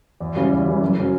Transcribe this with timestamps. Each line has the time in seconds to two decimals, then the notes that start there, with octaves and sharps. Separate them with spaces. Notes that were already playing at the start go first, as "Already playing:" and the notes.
0.20 E2
0.36 C#3 E3 G3 C#4
0.51 E2
0.66 C#3 E3 G3 C#4
0.81 F#2
0.97 C#3 F#3 C#4